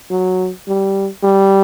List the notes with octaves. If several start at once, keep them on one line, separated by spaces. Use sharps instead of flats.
F#3
G3
G3